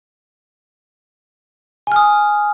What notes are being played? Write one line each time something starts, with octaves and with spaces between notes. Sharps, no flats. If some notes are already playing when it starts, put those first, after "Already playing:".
G#5 D#6 F6